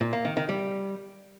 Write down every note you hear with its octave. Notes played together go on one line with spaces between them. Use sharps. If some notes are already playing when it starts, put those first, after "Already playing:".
A#2
A#3
D#3
D#3
G3